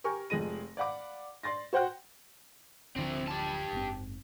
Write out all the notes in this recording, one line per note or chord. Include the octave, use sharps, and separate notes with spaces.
G4 A#4 G#5 C#6
F1 F3 G#3 A#6 D#7
D5 F5 F#5 B5 D6
D5 C6 A6 A#6
F#4 C5 F#5 G5 F#6
D1 D3 F3 C4 E4
G4 A5
F#1 G#2 C4